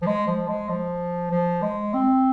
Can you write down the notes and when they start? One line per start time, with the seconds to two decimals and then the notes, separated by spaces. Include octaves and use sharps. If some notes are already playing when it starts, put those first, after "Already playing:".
0.02 F3
0.06 G#3
0.27 F3
0.48 G#3
0.69 F3
1.31 F3
1.62 G#3
1.93 C4